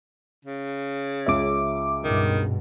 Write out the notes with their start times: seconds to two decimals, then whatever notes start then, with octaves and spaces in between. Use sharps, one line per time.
0.45 C#3
1.26 C#2 F4 C#5 E5 D6
2.04 G2 B2 D#3